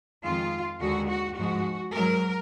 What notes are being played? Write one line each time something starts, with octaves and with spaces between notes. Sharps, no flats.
F2 D#3 G#3 F4
D#2 D3 G#3 F#4
F#4
G#2 F3 G#3 F#4
G#2 F#3 A#4